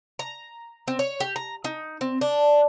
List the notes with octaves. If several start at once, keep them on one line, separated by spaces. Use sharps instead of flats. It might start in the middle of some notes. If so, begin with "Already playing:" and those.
A#5
C4
C#5
G4
A#5
D#4
C4
D4